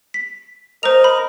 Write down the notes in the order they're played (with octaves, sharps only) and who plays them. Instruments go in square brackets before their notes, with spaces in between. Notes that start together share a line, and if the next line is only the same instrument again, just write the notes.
[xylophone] B6
[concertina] A#4 D#5 [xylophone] C5 F7
[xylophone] B5